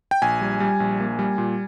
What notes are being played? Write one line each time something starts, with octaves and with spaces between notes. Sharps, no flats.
G5
A#1 G#5
G3
G3
A#1
A#3
G3
A#2